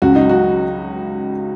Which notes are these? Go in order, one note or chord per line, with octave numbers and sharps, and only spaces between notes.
C#2 C#3 F#3 F#4
D#4
F#4